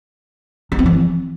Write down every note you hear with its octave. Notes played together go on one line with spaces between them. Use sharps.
D4
C4
E3